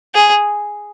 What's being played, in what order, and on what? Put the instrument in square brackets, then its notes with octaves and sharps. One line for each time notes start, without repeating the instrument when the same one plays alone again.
[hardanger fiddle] G#4